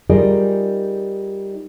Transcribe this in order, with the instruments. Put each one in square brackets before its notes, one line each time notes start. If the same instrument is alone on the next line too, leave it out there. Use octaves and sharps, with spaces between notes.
[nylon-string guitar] G3 D#4 F4 G#4 A#4 D5